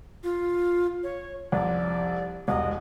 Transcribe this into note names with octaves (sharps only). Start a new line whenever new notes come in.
F4
C#5
C2 F2 D5
E1 C2 D#5